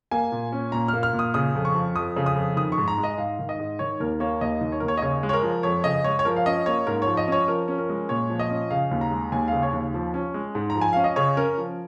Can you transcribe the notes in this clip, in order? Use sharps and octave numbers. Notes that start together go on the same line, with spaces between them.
A#3 G#5
A#2
C#4
A#2 A#5
F6
A#3
F6
A#2
D#6
C#3 D#6
F2
C#6
F3
F2 D#6
C#3
D#6
F2
D#3 D#6
C#6
G#2
A#5
G#3
D#5
G#2 F5
D#3
D#5
G#2
D#3 C#5
D#2 A#4
A#3 C#5
D#2 D#5
D#3
C#5
D#2 A#4
C#5
D#5
C#3 C#5
G#3
C#5
A#4
F3
F2 C#5
C#3 D#5
G#3 C#5
C#5
F3 A#4
F5
C#4 D#5
A#3 C#5
G#2 A#4
F3 C#5
D#5
C#4 C#5
F3 A#4
C#4
A#4
G#3
A#2 C#5
F3
D#5
C#4
C#3 F5
D#2
A#5
G#3
D#2 G#5
C#3 F5
C#5
D#2
F3
C#4
G#3
G#2
A#5
F3
G#5
C#4 F5
D#5
C#3 C#5
C#4 A#4
F3